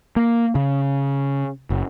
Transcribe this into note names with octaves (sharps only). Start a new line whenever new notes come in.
A#3
C#3
F#1